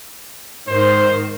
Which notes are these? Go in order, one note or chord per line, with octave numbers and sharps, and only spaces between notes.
G#2 D#3 C5